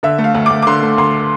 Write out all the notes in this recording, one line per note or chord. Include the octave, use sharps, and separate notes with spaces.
D3 E5
A3
F5
D2
D2 D6
D6
D3 C6
A3
D2 C6